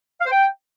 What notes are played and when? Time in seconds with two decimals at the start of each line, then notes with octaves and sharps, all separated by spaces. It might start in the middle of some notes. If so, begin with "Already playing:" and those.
0.21 F5
0.26 C5
0.31 G5